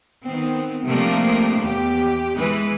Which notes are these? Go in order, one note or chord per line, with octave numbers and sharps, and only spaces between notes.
D#3 B3 C4
C3 F3 A3 A#3 D4 A#4
E2 G4
E3 G#3 B4